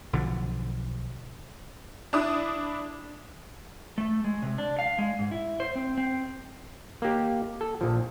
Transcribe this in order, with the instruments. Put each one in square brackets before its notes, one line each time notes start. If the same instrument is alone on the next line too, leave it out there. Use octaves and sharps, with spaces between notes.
[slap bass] B1 D3 F3
[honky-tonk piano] D4 E4 D#6
[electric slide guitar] A3
G#3
C3
D4
F5
G#3
G#2
E4
C5
C4
C4
[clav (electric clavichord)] A#3 G4
A4
A#1 F3